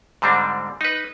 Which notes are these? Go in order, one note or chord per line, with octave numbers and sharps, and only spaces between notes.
G#2 D3 G3 C4 D4
D#4 B4